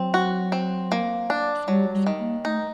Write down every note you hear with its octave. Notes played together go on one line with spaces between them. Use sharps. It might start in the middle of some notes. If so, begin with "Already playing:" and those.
Already playing: F#3 C4
F#4
C4
A#3
D4
F#3 G3
G3
D#3
A#3
A3 D#4